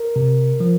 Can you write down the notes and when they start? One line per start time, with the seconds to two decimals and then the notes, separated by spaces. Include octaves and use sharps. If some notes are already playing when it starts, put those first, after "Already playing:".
Already playing: A#4
0.16 C3
0.60 F3